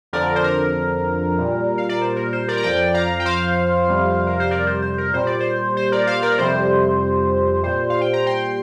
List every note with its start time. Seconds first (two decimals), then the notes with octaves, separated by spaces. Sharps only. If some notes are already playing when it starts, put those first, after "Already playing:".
0.13 F2 D3 F3 A#4 D5
0.36 C5
0.44 A#4
1.38 A#2 G3
1.78 F5
1.89 D5
2.01 C5
2.16 A#4
2.33 C5
2.48 A#4 D5
2.57 A#5
2.63 F2 F3 D5 G5
2.94 F5 A#5
3.20 G5
3.26 C5 F5
3.88 F2 C3 G3
4.27 A#4
4.40 C5
4.51 A#4 D5
4.67 C5
4.82 C5
4.98 A#4
5.13 A#2 G3 C5
5.27 D5
5.40 C5
5.77 C5
5.92 A#4 D5
6.07 C5 F5
6.22 A#4 D5
6.38 F2 C3 G3 C5
7.63 A#2 G3 C5
7.90 F5
8.01 G5
8.13 A#5
8.27 G5 C6